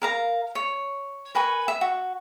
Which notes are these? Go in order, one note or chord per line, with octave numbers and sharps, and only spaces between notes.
A#4 F5 A#5
C#5
A#4 B4 G#5 C#6
E5
F#4